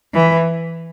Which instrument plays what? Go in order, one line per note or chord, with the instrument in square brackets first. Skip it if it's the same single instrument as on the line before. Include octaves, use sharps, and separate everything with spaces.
[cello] E3